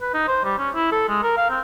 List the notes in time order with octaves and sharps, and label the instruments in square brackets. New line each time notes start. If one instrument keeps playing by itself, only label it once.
[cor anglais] B4
D#4
C5
G3
C#4
E4
A4
G#3
A#4
F5
C4